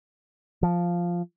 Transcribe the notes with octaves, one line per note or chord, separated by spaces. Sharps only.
F3